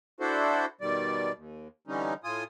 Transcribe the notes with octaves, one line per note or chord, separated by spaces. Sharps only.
D4 E4 F#4 A4 C5
B2 D#3 G3 D5
D#2
D3 E3 G3 C#4 D#4
A2 F4 G#5 D#6